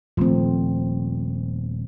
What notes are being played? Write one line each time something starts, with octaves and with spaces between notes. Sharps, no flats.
D#1 F3 A3 C4